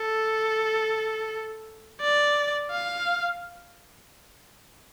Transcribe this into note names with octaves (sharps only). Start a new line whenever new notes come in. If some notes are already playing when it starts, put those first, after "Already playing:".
Already playing: A4
D5
F5